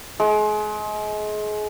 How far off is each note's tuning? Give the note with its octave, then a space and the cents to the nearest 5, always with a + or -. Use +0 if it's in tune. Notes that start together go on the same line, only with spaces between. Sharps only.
G#3 +30